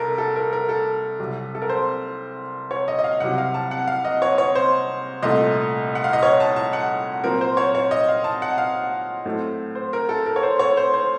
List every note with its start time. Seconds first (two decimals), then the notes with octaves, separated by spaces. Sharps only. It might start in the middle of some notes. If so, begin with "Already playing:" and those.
Already playing: C2 A4 A#4
0.18 A4
0.36 A#4
0.53 A#4
0.69 A4
1.19 C2 C3 F#3
1.55 A4
1.62 A#4
1.69 C5
2.71 C#5
2.88 D#5
2.99 D#5
3.04 F5
3.20 C2 C3 F#3 F#5
3.38 F5
3.54 A5
3.71 F#5
3.87 F5
4.05 D#5
4.22 C#5
4.38 C#5
4.55 C5
5.22 C2 A#2 A3 D#5
5.95 F#5
6.04 F5
6.13 D#5
6.23 C#5
6.40 A5
6.56 A5
6.73 F#5
7.24 A#2 F#3 C4 A#4
7.41 C5
7.57 C#5
7.75 C#5
7.91 D#5
8.08 F5
8.24 A5
8.42 F#5
8.58 F5
9.26 A2 F#3 A3 C4
9.75 C5
9.93 A#4
10.09 A4
10.26 A#4
10.36 C#5
10.43 C5
10.59 C#5
10.77 C5
10.94 C5